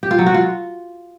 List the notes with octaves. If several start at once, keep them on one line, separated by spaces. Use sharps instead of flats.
G4
F4
F#3
F#4
F4